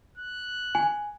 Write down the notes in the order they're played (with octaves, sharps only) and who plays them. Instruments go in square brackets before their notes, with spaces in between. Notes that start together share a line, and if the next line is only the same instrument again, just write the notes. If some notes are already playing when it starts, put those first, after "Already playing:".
[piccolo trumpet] F#6
[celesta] G#5